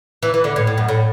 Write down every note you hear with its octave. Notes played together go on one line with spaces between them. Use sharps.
E3
E3
D3
A2
A2
F#2
A2